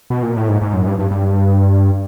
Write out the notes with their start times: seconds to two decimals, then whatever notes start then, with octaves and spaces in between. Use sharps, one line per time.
0.10 B2
0.23 A#2
0.36 A2
0.49 G#2
0.61 G#2
0.74 F#2
0.87 G2
0.99 G2
1.11 G2